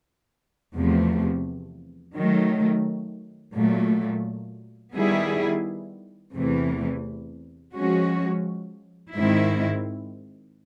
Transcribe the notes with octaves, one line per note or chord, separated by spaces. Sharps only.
E2 C3 F3 A3
D#3 F#3 A3
A#2 F#3 A3
D#3 G3 B3 E4 G#4
E2 C3 E3 A3
F3 G#3 C#4 F#4
G#2 D#3 G#3 C4 E4